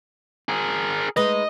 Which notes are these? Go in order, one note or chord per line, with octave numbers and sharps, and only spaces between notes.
G#4 A#4
G#3 D#4 B4 D#5